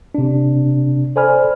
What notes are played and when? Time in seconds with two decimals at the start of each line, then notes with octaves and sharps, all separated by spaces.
0.15 C3 D4
1.16 A4 C5 D5 G#5 B5 F6